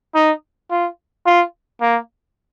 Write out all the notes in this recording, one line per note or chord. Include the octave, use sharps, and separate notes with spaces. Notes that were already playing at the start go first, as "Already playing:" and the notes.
D#4
F4
F4
A#3